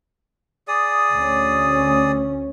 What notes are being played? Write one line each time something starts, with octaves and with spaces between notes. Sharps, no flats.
G#4 D5 D#6
D2 C#4